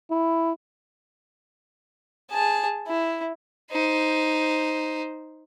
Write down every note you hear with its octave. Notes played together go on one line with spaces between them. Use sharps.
E4
G#4 A5
E4
D#4 C5